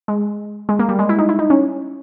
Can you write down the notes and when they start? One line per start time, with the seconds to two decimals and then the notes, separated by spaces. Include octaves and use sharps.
0.08 G#3
0.69 G#3
0.79 A#3
0.89 G3
0.99 G#3
1.09 E4
1.19 D#4
1.29 E4
1.39 D#4
1.50 C#4